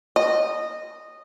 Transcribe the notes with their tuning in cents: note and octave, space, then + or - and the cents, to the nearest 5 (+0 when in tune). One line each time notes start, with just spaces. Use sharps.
D#5 -15